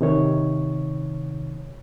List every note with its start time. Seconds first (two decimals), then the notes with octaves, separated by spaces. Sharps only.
0.01 C3 D#3 C#5